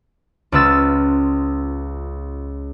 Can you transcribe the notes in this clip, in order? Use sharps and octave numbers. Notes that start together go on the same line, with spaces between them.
C#2 F4 B4 E6 A6